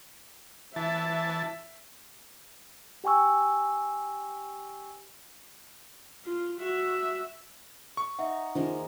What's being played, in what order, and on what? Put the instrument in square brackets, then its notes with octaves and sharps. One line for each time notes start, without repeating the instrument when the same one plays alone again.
[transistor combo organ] E3 A5 [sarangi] E5
[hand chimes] G4 G5 G#5 C#6 E6
[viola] F4
F#4 E5
[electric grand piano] C#6
[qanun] D#4 [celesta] E5 F#5
[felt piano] D#3 [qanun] F3 G#3 A#3